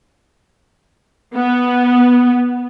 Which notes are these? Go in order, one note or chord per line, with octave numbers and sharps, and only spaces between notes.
B3